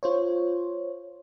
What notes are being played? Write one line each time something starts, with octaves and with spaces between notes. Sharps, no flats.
F4 C5 C#5